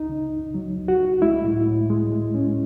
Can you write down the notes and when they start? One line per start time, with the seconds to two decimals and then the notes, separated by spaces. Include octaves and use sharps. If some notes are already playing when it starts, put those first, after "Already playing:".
Already playing: C#2 D#4
0.09 C#3
0.32 C#2
0.55 F#3
0.77 C#2
0.88 F#4
0.99 C#2
1.22 G#3 E4
1.44 A2
1.67 A2
1.90 G#3
2.12 G#3
2.34 C#4